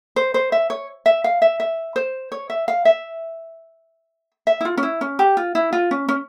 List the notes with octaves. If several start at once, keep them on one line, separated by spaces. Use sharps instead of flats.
C5
C5
E5
C#5
E5
F5
E5
E5
C5
C#5
E5
F5
E5
E5
E4
F4
C#4
E4
C#4
G4
F4
E4
F4
C#4
C#4